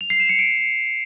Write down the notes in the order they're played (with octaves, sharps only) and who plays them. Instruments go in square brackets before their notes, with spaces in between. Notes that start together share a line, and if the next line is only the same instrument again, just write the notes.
[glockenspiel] F7
C7
E7
C#7
D7